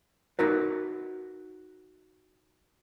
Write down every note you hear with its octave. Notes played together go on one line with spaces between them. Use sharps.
D#4 F#4 A#4 B4